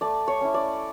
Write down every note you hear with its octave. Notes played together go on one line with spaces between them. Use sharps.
A3 D5
C#5
C#4 E4
D5